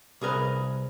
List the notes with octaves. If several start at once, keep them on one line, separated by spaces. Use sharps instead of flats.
C2 G#4 A#4 B4